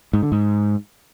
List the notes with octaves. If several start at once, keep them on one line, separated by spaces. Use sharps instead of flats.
G#2
D3
G#2